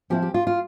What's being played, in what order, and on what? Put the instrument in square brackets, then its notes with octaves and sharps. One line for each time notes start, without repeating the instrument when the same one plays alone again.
[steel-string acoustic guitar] F3 C4 E4 G4
G4
F4
F4